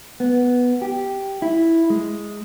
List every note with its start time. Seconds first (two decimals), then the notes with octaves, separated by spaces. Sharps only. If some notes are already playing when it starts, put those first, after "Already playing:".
0.20 B3
0.82 G4
1.42 E4
1.90 G#3